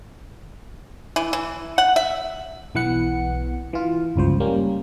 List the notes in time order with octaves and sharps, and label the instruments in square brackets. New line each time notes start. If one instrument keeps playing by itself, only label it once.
[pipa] E3
E3
F#5
E5
[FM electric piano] B1 E3 B3 F#5 C#7
E3 F4
G1 C#2 F3 C5
G3 A#3 C#4